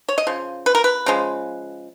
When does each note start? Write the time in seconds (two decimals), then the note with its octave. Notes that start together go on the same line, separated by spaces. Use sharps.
0.09 C#5
0.18 D#5
0.27 C#3 F3
0.66 B4
0.75 A#4
0.84 B4
1.06 C#3 F3 G#3